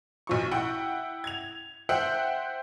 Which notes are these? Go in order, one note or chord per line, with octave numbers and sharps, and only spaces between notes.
B1 F3 C#6
E4 F#5 G5
G#6 F7
C5 E5 F#5 G5 F#6